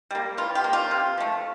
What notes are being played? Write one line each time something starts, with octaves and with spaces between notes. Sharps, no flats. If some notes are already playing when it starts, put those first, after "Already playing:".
G3 A#3
E3 F4
G4
A#3
F4
C3
F3 A3